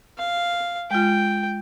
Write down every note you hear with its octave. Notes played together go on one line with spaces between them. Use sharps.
F5
G#3 F4 G5